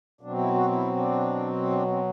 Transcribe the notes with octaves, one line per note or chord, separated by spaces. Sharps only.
B2 F#3 C4 D4
E4
F#4
E4
D4
D4
C4